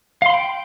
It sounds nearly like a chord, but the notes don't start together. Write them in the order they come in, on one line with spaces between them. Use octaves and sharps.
F5 C6 B5 G5